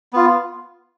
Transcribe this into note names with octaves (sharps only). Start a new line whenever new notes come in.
B3 F4